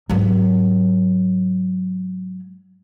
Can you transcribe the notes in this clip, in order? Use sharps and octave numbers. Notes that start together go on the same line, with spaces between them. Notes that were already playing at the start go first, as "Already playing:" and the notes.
G#2 F#3